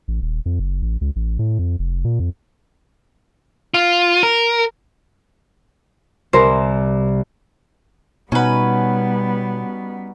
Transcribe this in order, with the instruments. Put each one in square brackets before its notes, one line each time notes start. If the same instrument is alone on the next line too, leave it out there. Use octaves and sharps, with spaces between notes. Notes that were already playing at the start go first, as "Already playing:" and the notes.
[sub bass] A1
D#1
F2
F#1
A1
C#2
A1
A2
F2
F1
A#2
F2
[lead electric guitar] F4
A#4
[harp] C2 [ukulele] A#4 C5
[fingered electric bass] B2 [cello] G3 B3 [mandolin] C#4 B4 [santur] D#4 F#4